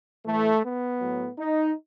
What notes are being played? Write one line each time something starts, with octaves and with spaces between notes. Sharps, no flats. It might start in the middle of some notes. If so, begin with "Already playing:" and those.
A2 E3 A3
B3
A2 F#3
D#4